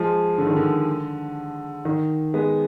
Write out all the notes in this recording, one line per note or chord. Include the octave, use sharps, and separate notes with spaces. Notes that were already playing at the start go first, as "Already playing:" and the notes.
Already playing: F3 G#3
D3
D#3
D3
D#3
G#3 B3